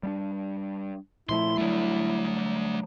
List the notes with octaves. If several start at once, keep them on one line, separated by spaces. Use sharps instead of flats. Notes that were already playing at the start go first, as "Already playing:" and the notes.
G3 B3 D4
A#2 F3 A3 E4 C6
F#3 G3 A3 D4